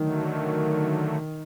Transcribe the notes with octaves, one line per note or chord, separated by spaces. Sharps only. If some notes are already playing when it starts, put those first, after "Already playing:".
Already playing: D3 D#3 F#3 A3